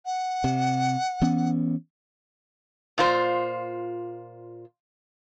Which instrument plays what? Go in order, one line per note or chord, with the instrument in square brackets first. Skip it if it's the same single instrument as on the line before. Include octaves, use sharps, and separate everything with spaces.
[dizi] F#5
[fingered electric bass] C3
E3 B3 C#4
[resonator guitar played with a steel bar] A#2 F4 C5